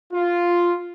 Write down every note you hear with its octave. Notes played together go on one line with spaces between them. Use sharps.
F4